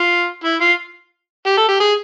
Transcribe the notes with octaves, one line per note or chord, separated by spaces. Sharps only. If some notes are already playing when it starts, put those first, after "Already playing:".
Already playing: F4
E4
F4
G4
A4
G4
G#4